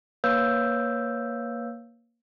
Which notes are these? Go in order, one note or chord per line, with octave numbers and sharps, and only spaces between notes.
A#3 B4 C#5 F5 E6 G6